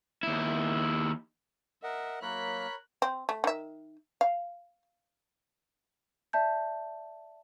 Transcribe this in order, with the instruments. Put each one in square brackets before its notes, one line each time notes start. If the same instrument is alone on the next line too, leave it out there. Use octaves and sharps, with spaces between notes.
[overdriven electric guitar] D#2 E4
[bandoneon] A#4 D#5 F#5 [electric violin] E5
[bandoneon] F#3 A#3 [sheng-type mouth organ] A#4 C#5 B5 [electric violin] F#6 B6
[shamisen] C4
A3
D#3 E5
F5
[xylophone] D5 E5 A5 G6